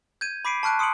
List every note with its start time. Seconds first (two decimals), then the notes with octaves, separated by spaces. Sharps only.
0.21 G6 G#6 D#7
0.45 B5 D6 B6 C7 D7 D#7
0.63 A5 C#6 F6 F#6 D7
0.79 C6 D#6 C#7 D7 F#7